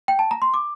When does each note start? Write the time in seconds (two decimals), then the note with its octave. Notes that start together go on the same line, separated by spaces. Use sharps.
0.08 G5
0.19 A5
0.31 A#5
0.42 C6
0.54 D6